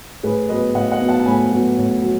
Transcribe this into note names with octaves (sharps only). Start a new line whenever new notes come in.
A2 G#4 B4
F#3 B3 B4 D#5
A2 D#5 F#5
D#5 F#5
F#3 B3
F#5 A5
A5
A2 G#5 B5
F#3 B3
A2
F#3